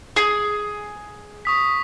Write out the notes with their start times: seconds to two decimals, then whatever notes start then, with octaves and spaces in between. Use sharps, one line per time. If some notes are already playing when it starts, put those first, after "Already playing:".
0.16 G#4
1.45 C#6 D#6 B6